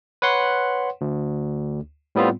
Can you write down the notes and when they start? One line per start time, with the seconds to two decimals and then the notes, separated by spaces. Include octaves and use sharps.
0.22 B4 C#5 F#5 C6
1.01 D2
2.15 A2 G3 B3 C4 F4